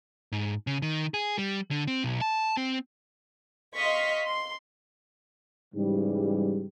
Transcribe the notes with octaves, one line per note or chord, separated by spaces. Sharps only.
G#2
C#3
D#3
G#4
G3
D3
C4
B1
A5
C4
D#5 F5 C6 C#6 B6
C6
G#2 C#3 E3 G3